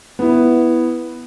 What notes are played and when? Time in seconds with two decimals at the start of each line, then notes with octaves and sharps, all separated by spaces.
0.19 B3 E4